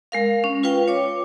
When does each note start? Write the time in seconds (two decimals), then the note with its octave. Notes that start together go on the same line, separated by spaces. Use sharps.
0.12 G#3 A#4 F5
0.44 C#4
0.63 F4 B4 F5 G5
0.88 C#5 D6